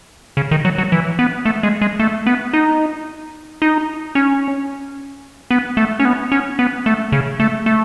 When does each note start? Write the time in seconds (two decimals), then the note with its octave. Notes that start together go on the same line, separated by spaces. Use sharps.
0.37 C#3
0.51 D#3
0.65 F#3
0.78 F#3
0.92 E3
1.19 B3
1.45 A3
1.63 G#3
1.81 G#3
2.00 A3
2.26 B3
2.53 D#4
3.62 D#4
4.15 C#4
5.51 B3
5.77 A3
6.00 C#4
6.05 B3
6.32 C#4
6.59 B3
6.86 A3
7.12 C#3
7.40 A3
7.66 A3